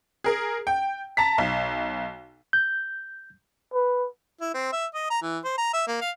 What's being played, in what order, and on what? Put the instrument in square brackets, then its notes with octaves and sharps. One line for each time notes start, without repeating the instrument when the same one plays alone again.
[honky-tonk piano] G#4 A#4
G5
A5 A#5 B6
B1
[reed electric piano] G6
[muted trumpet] B4
[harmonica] E4
C4
E5
D#5
A#5
E3
C5
A#5
E5
A#3
F5